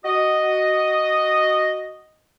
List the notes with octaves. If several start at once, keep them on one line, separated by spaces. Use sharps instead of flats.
F#4 D#5